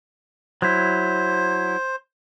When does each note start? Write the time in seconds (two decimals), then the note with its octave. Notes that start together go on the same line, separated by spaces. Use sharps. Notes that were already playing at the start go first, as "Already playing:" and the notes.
0.62 F#3 E4 C5